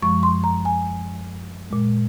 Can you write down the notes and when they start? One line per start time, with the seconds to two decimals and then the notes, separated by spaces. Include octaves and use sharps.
0.02 F#2 F3 G#3 C#6
0.23 C6
0.44 A#5
0.65 G#5
1.70 A#2 G#3